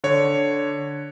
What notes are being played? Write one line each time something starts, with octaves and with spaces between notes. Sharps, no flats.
D3 C#5